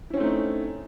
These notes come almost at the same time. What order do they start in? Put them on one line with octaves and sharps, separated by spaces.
E4 C#4 C4 A3 D#4